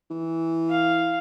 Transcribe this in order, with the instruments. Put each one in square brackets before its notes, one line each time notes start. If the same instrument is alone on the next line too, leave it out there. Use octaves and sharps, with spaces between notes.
[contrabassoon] E3
[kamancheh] F5